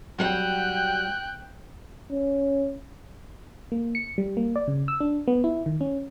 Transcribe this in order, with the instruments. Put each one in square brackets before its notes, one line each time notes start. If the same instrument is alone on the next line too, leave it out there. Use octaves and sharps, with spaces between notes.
[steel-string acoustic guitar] F#3 G3 F#5 [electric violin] G5 F#6
[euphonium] C#4
[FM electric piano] A#3
C#7
G3
A#3
D5
C#3
E6
D4
B3
E4
D#3
C#4